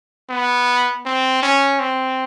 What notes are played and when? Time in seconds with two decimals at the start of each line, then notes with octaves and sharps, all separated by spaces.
0.29 B3
1.05 C4
1.43 C#4
1.80 C4